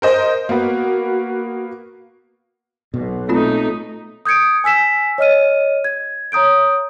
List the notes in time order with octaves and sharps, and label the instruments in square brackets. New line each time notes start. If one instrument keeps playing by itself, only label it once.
[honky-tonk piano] A#4 C5 D#5
[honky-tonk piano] A#3 B3 [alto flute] F#4
[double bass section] B1 [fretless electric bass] B2
[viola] A3 D#4 [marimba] A#3 C4 F4
[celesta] D#6 G6 G#6 C#7 D7
G#5 E6 B6 E7
C#5 D#5 F6 D#7
G#6
C#5 A#5 D#6 G6 D7